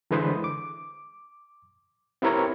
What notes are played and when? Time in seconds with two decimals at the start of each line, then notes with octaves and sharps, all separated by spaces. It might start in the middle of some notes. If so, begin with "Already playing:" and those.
0.11 D3 E3 G#3 B4 C5 D#6
0.44 D6
2.22 C4 E4 G4 A#4 B4 C#5